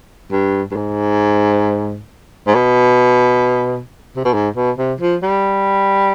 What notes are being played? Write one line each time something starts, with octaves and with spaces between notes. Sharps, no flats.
G2
G2
G#2
G#2
B2
C3
B2
G#2
B2
C3
F3
G3